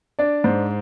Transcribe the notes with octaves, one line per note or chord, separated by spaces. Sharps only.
D4 D5
G#2 C5